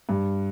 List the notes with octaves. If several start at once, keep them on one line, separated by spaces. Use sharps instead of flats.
G2